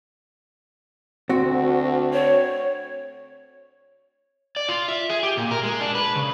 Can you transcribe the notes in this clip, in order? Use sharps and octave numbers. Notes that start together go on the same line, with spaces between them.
D2 C4 F#4
C#5
D5
F4
E5
G#4
G4
A#2
A#4
G#3
D4
B4
C#3